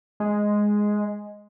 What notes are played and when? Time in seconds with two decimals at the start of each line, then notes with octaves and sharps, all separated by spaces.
0.20 G#3